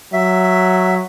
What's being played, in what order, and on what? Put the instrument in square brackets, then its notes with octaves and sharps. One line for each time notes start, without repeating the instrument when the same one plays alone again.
[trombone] F#3 [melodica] E5